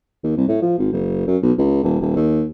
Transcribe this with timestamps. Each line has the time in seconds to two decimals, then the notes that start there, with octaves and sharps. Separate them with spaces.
0.24 D#2
0.37 C2
0.48 A2
0.62 F3
0.78 G#1
0.92 F#1
1.27 F#2
1.42 B1
1.58 C#2
1.83 D#1
2.01 D#1
2.16 D#2